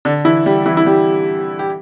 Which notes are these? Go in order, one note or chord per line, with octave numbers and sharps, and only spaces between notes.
D3 D4
E3 E4
G3 G4
E3 E4
E4
G3 G4
G4